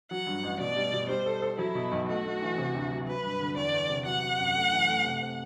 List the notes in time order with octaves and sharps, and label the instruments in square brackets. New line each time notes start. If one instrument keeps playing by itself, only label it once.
[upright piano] F#3 [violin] F#5
[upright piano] G2
A1
[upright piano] B2 [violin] D5
[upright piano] G3
B2
[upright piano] G3 [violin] C5
[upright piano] A4
A4
[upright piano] F#3 [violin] E4
[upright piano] B2
B1
[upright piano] A3 [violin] F#4
[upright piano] A3
E3
C3
D2
F#3
[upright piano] F#3 [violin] B4
[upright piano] G2
D3
[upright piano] E2 [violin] D5
[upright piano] E2
C3
[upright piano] F#3 [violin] F#5
[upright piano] F#3
F#2
A3
E3
A3
C3
C4